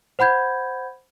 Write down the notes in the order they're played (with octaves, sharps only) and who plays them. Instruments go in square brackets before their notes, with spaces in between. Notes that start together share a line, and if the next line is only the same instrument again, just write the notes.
[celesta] C5 F#5 B5 G6 G#6